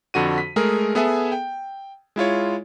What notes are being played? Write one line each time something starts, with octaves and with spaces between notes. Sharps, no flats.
F2 D3 F#4 D#7
B6
G#3 A3 G#4 A#4
B3 G#4 A4 E5 G#5
G5
G#3 E4 F4 C#5